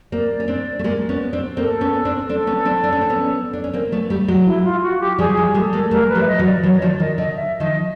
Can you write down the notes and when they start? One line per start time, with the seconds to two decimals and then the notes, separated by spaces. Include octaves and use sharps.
0.12 A#3 C4 D5
0.40 C#4
0.48 C4 D4
0.79 A3
0.84 G#3 A#3
1.09 B3 C#4
1.33 C4 D4
1.57 A#3 C4 A4
1.81 B3 C#4
2.05 C4 D4
2.29 C4 D4 A4
2.47 B3 C#4
2.65 C4 D4
2.83 D4
2.92 C#4
3.01 C4
3.10 B3 C#4
3.53 D4
3.64 C#4
3.73 A#3 C4
3.92 A3 B3
4.10 G3 A3
4.28 F#3 G#3
4.46 E4
4.64 F4
4.82 F#4
5.00 G4
5.19 F3 G3 G#4
5.37 F3 G3
5.54 G3 A3 A4
5.73 G#3 A#3
5.91 G3 A3 A#4
6.09 B4
6.15 F3 G3
6.21 E5
6.28 D#5
6.39 E3 F#3
6.45 D5
6.63 E3 F#3 C#5
6.74 F#3
6.81 D#3 F3 D5
6.99 D#3 D#5
7.18 D3 D#5
7.36 E5
7.60 D#3 F3 D#5